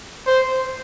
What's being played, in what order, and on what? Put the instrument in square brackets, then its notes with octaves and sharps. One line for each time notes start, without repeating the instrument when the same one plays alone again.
[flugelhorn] C5